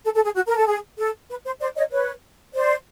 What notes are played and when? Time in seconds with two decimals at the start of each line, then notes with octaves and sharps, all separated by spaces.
0.04 A4
0.14 A4
0.25 G#4
0.35 F#4
0.47 A#4
0.56 A4
0.66 G#4
0.98 A4
1.29 B4
1.44 C5
1.60 C5 D5
1.76 C#5 D#5
1.92 B4 C#5
2.55 C5 D5